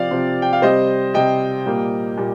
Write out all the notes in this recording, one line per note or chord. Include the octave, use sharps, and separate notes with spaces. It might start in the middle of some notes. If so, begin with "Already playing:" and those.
Already playing: C3 F3 C4 D5 F5
C3 F3 C4
G5
F5
C3 G3 C4 C5 D#5
C3 G3 C4 D#5 G5
A#2 G3 A#3
A#2 G3